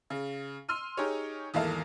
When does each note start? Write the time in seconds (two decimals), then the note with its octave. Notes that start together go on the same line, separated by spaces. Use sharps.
0.10 C#3
0.69 C6 E6 F6 D#7
0.97 D#4 G4 G#4 C#5
1.54 G#1 E2 A#3 A4 F5